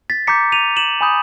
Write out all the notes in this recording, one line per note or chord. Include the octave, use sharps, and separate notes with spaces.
A6 B6
A#5 D6 G6 B6 C#7
D#7 F7
E7 F#7
G#5 B5 D#6 G6